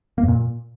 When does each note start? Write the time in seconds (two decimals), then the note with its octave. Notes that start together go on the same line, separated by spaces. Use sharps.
0.18 A#3
0.23 F2
0.28 A#2